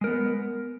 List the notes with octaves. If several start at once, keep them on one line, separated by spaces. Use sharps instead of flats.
G#3 B3 A#4